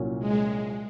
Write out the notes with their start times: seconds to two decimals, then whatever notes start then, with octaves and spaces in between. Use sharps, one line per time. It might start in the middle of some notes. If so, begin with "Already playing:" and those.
Already playing: C2 A#2 F#3 C#4
0.19 G#3